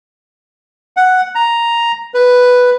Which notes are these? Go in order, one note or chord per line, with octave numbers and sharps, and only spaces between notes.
F#5
A#5
B4